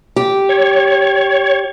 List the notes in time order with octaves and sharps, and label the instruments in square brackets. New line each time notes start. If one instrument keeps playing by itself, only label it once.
[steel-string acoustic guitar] G4
[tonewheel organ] C#5